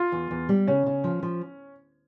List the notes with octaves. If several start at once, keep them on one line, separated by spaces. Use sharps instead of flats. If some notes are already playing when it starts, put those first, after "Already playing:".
Already playing: F4
E2
E2
G3
C#3 C#4
C#3
F3
F3